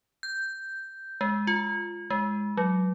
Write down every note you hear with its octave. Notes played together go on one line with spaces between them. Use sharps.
G6
G#3
F4
G#3
F#3